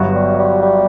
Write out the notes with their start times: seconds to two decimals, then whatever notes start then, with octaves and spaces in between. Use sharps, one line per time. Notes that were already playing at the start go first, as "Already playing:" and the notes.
Already playing: G1 G2 F#3 B3 F#4
0.15 G3
0.38 G3
0.62 G3